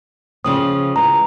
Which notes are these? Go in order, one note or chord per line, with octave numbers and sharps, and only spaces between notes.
C#3 F3 C4 D#6
E3 G#3 A#5